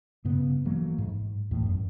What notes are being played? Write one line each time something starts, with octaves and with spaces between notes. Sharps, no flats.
G2 C#3 B3
E3 F#3 A3 A#3
G#2
E2 A2
F#2